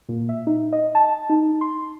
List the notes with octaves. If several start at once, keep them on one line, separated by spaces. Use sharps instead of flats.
A#2
E5
D#4
D#5
A5
D#4
C6